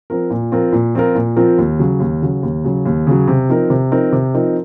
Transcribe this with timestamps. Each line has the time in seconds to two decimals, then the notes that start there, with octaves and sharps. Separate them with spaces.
0.10 F3 C4 F4 A#4
0.30 A#2
0.52 F3 C4 F4 A#4
0.72 A#2
0.95 F3 C4 F4 A#4
1.15 A#2
1.36 F3 C4 F4 A#4
1.58 D#2
1.79 C#3 F#3
2.00 D#2
2.22 C#3 F#3
2.43 D#2
2.64 C#3 F#3
2.85 D#2
3.07 C#3 F#3
3.27 C3
3.49 F3 C4 D#4 A#4
3.70 C3
3.91 F3 C4 D#4 A#4
4.12 C3
4.34 F3 C4 D#4 A#4